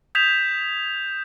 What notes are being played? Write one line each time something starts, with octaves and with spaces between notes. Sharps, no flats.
D#6 G6 G#6 B6 E7 F7